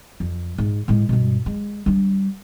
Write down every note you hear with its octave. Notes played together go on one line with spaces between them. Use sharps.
F2
G#2
A2 G#3
G2 B2
G#3
G3 D4